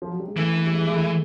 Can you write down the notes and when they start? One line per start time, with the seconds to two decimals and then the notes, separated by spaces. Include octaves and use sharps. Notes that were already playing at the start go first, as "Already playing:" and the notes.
0.02 F3
0.11 F#3
0.20 G3
0.28 G#3
0.37 E3 A3
0.56 A3
0.66 G3
0.74 G#3
0.87 G#3
0.93 A3